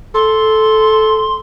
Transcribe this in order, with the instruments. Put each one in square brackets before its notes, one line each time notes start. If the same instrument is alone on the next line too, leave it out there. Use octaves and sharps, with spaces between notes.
[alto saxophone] A4 [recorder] C6